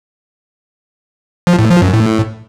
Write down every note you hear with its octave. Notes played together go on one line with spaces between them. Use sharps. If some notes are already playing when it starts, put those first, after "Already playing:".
F3
A2
F3
F#2
A2